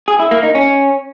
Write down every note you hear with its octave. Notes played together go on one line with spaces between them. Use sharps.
G#4
E4
A#3
D#4
C#4